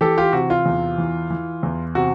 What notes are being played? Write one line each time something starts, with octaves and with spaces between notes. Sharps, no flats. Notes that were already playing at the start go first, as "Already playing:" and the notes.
E3 G4 A4
F4 G4
C3 F#4
F4
E2
E3
E3
E2
C3 F#4